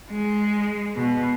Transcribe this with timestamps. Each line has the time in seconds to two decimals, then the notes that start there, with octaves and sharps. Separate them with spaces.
0.11 G#3
0.96 B2